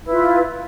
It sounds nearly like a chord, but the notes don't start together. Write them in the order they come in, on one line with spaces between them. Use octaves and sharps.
E4 B4 F4